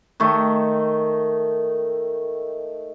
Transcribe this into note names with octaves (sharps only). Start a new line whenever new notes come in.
D#3 A3